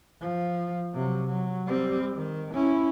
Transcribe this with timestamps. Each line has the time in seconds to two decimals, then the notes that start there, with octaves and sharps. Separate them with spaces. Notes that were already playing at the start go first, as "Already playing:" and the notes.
0.20 F3
0.94 C3 F#3
1.26 F#3
1.67 G3 C4
2.16 D#3
2.54 C#4 E4